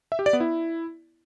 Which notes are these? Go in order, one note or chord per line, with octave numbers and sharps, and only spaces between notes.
E5
G4
D5
B3
E4